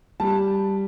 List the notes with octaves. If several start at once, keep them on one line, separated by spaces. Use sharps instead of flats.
G3 A5